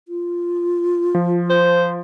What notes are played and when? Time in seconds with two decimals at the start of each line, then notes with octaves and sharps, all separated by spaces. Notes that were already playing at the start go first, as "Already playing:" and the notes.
0.08 F4
1.15 F3
1.50 C5